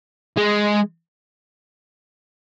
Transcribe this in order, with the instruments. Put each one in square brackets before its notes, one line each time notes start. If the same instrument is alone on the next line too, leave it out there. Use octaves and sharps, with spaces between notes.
[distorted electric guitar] G#3